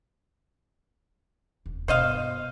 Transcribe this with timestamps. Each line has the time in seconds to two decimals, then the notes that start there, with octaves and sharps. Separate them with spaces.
1.66 D#1
1.88 G2 B2 C5 D#5 F5